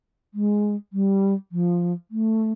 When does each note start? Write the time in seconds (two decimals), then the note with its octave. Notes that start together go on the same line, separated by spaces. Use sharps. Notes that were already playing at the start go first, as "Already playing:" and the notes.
0.34 G#3
0.93 G3
1.52 F3
2.11 A3